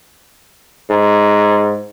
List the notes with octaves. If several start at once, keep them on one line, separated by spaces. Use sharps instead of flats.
G#2